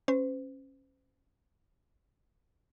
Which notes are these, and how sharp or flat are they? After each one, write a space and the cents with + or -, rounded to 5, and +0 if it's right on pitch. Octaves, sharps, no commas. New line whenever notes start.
C#4 -25 C5 -40